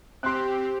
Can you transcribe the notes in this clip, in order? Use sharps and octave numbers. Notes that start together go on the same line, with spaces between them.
C4 G4 C6 F#6